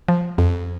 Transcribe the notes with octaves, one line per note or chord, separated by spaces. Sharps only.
F3
F2